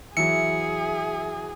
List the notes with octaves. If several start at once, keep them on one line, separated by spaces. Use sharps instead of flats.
E3 F#3 G#4 E5 C#7